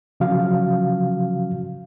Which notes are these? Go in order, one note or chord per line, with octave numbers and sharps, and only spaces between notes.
C#3 F3 F#3 C#4 F#4 F5